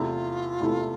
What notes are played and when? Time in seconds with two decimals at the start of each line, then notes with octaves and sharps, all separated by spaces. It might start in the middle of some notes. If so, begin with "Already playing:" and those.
Already playing: E2 C3 E3 A3 E4 F4
0.60 E2 C3 E3 A3 E4